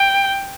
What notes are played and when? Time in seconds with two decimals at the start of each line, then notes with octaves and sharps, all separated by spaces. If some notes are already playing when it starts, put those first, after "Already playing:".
Already playing: G5